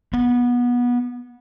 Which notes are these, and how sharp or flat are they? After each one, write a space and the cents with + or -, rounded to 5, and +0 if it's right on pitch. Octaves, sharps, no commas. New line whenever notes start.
B3 -20